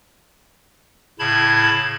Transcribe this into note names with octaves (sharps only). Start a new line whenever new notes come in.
A2 C#3 E4 A5 B5 G#6